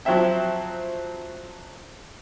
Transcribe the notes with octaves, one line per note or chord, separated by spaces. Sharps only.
F3 F#3 C4 C5 E5 G5